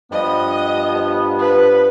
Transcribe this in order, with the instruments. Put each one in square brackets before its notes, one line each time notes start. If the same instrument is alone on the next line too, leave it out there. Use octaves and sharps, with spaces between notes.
[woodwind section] G2 F3 B3 [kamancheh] D#5
[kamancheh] B4